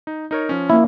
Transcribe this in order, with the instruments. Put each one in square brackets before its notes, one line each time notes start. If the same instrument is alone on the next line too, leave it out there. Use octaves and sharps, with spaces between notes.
[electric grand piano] D#4
D#4 A#4 C#5
F3 C#4
[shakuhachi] A#3 [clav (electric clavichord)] E4